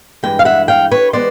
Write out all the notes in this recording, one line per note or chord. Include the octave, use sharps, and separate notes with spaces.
G2 E3 G#3 G5
F5
E5 F#5
F5 G5
B4 C#5
E3 G#3 B3 C5 D5